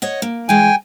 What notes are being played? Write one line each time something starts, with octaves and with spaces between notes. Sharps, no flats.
C#5 D#5 F#5
A#3
E3 G#3 G5 G#5